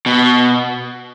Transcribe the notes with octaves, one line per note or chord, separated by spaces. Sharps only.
B2